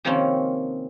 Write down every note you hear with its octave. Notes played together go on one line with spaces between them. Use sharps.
C3 D#3 F3 A#3 C4 C#4